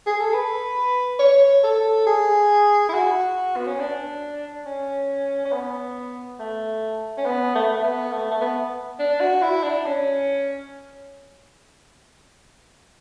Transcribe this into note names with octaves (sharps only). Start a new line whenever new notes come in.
G#4
A4
B4
C#5
A4
G#4
E4
F#4
B3
C#4
D4
C#4
C#4
B3
A3
C#4
B3
A3
A3
B3
A3
A3
B3
D4
F#4
E4
D4
C#4